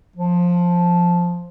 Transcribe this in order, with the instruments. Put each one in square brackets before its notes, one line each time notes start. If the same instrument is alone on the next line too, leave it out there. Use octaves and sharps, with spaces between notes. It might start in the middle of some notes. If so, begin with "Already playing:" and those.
[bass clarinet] F3